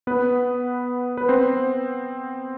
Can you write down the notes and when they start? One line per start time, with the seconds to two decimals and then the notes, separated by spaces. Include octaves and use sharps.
0.07 B3 B4
1.17 B4
1.28 C4 C5